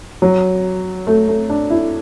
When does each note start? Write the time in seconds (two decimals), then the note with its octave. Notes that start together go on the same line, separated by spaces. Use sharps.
0.22 F#3
1.07 A3
1.28 A3
1.50 D4
1.70 E4